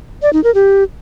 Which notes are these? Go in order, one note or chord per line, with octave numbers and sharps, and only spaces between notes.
D5
D#4
A#4
G4